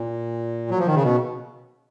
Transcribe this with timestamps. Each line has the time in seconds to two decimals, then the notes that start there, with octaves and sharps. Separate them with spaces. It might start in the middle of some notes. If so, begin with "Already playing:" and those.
Already playing: A#2
0.70 F#3
0.79 F3
0.87 D#3
0.95 C#3
1.03 B2